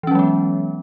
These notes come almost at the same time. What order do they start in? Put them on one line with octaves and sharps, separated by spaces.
E3 C#4 F#3 G#3 B3